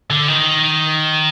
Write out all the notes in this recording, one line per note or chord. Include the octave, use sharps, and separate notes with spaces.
D3
D#3